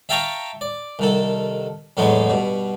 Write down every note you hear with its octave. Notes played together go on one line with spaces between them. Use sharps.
E5 F5 G5 A5 A#5 C#6
D5
C2 D#3 A4
E2 A2 F#3 G#3 B3
G2 B2